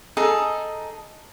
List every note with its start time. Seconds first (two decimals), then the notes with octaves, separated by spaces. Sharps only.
0.17 D#4 G#4 A4